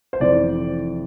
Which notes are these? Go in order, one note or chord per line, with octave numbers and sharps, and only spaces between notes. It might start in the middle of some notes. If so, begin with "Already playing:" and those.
C5
F1 F2 E3 D5